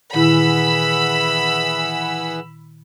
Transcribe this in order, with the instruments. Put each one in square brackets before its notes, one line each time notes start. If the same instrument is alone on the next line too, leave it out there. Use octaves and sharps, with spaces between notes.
[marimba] A#2 D#3 E4 [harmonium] E3 G#4 F#5 [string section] B5 E6